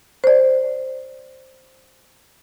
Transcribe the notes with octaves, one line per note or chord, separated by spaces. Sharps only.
C5 D5